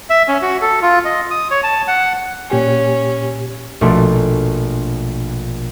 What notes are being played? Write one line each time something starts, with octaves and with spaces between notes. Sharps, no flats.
E5
C#4
F#4
A4
F4
D#5
D#6
C#5
A5
F#5
A#2 C#4 G4 G#5
A#1 B2 A3 D4 C6 B6